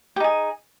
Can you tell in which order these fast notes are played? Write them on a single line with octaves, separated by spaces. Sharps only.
G4 D#4 G#4